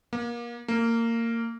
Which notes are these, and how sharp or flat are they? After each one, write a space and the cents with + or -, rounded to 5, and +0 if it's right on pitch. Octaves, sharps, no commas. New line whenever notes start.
A#3 +30
A#3 -20